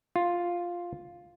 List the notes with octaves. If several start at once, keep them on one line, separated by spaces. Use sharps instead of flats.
F4